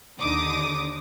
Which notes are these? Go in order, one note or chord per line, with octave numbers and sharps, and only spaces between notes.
D#2 D3 D#4 D6 D#6